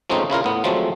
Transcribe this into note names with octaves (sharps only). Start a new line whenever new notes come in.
F3 G#3 A3 C4 C#4 D#4
C#3 E4 F4 A#4
A2 B3
F3 F#3 G#3 A3 C4